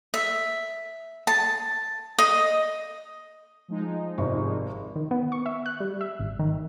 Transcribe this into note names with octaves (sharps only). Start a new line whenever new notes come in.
E5
A5
D#5
F3 G#3 D#4
G#1 C3 C#6
D#3
B3
C#6
E5
F#6
G3
E5
G#1
D#3